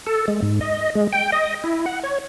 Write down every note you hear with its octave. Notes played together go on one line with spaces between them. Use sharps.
A4
G#3
G#2
D#5
G#3
G5
D#5
E4
F#5
C#5